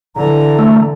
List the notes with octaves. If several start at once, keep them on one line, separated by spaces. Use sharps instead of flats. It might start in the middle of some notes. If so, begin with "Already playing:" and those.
D3 E3 A#5
A3